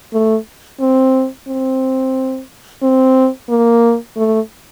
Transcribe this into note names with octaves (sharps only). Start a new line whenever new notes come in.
A3
C4
C4
C4
A#3
A3